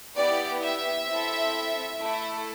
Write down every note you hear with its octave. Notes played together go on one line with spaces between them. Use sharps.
B3 E4 G4 D5
E5
C4 E4 A4
A3 E4 A4